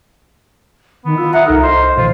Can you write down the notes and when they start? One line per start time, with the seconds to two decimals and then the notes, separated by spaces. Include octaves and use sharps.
1.05 D#3 B3
1.18 F4 E6
1.33 E5 F#5 A#5 D#6
1.46 C2 D#4 A4 A#4 F6
1.63 C5 D#5
1.98 A#2 D#3 F3 F4 C5